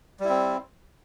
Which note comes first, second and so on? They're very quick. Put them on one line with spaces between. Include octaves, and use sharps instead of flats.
G3 E4 C4